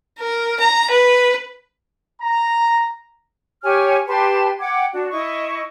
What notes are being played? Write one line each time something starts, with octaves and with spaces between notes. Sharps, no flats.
A#4
A#5
B4
A#5
G4 C#5 G#5 F6
G4 B4 A5 C6
F#5 G5 D6 G#6
D4 F#4
E4 D#5 C#6 D#6